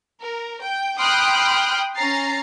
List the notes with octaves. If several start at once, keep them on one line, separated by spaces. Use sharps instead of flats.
A#4
G5
G5 B5 C6 D#6 F6 F#6
C#4 A#5 A6 C7